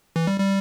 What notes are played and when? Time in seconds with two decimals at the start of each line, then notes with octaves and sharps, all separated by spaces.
0.16 E3
0.27 G3
0.40 G3